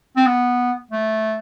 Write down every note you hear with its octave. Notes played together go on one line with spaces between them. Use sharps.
C4
B3
A3